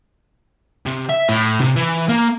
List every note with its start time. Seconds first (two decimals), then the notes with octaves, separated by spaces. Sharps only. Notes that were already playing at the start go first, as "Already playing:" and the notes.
0.86 C3
1.09 E5
1.29 A2
1.60 C3
1.76 E3
2.08 A#3